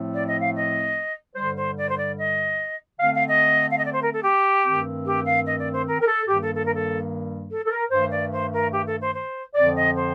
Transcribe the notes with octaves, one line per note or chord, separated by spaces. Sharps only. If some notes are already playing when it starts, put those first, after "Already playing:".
Already playing: A2 F3 A3 C4
D5
D#5
F5
D#5
G2 D3 G3 C5
C5
D5
C5
D5
D#5
D3 A3 C4 F5
F5
D#5
F5
D#5
D5
C5
A#4
A4
G4
G2 D#3 A3 C4
G4
F5
D#5
D5
C5
A#4
A#4
A4
G2 D#3 G3 A#3 G4
A4
A4
A#4
A4
A4
A4
A#4
G2 D#3 A3 C5
D5
C5
A#4
G4
A4
C5
C5
F2 D3 F3 C4 D5
D#5
C5